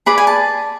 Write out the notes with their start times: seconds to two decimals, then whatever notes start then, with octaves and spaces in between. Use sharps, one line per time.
0.06 G#4 B4 D5 B5
0.18 G#5
0.27 A5